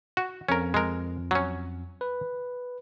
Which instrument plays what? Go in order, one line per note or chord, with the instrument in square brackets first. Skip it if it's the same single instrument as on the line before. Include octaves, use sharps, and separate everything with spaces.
[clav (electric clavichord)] F#4
[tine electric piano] F2 [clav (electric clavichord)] C#4 A#4
[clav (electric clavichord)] G#3 A#4
F#3 C#4
[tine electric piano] B4